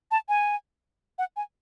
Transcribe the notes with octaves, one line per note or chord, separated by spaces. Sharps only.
A5
G#5
F#5
G#5